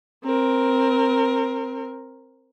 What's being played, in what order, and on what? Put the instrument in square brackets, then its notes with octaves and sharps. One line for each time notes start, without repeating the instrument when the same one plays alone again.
[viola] C4 A#4